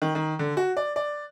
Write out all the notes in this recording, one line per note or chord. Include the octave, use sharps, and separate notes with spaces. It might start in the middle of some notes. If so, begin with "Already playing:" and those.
D#3
D#3
D3
F#4
D5
D5